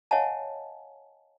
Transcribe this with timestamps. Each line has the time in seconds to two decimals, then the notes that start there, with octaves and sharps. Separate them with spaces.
0.11 C#5 D#5 F5 F#5 G#5 A5